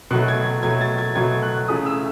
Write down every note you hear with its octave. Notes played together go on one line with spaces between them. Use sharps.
B2 F#3 A3 F#6
G#6
B2 F#3 A3 G#6
A6
G#6
B2 F#3 A3 G#6
F#6
C#3 E3 A3 D#6
E6